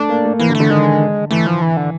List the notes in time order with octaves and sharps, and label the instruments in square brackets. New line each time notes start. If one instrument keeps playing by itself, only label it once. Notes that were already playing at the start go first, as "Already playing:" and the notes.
Already playing: [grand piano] A3 [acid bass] D4
[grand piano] A#3
A3
[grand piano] E3 [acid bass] A#3
[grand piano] D3
[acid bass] A3
[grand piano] D3
[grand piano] D#3 [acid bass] G#3
[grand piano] E3 [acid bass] A3
[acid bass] F3
E3
D3